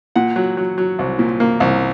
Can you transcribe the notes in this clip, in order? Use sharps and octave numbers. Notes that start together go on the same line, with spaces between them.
A#2 F#5
F#3
F#3
F#3
C2
A#2
A#3
C2